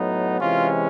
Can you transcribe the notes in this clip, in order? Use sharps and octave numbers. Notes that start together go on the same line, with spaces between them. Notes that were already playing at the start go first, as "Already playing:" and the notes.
Already playing: A2 F#3 B3 D#4
C3 E3 G#3 C#4 F4